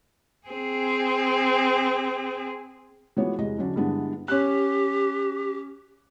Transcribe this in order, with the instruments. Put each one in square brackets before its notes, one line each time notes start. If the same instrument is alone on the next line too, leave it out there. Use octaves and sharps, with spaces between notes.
[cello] C4 G#4
[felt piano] E3 F3 G#3 B3 F#4 C#5
E2 C3 G#3 D#5
D3 F#3 C#4 D4
G2 D3 G#3 B3 D4 E4
[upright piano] C#4 F#6 [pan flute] G4